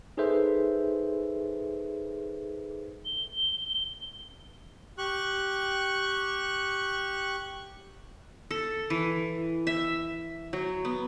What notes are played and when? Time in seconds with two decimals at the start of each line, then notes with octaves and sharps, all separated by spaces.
0.17 D#4 G#4 A4 B4 C5 E5
3.05 G7
4.98 G4 C#6 F#6
8.51 A4
8.90 E3
9.67 E5
10.53 F#3
10.85 B3